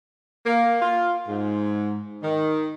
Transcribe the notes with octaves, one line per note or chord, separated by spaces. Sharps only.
A#3
F4
G#2
D#3